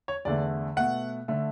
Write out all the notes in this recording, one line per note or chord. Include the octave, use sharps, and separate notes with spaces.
C#5
E2 D3 A3 D5
B2 A3 F#5
D3 A3